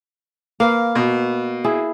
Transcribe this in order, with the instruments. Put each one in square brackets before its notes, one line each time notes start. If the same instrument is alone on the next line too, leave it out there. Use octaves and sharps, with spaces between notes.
[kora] A#3 B4 [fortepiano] F5
[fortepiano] B2
[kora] E4 G#4